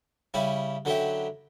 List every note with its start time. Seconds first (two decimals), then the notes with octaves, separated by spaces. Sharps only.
0.34 C#3 G3 C#4 E4
0.85 D3 F#3 C#4 E4 G4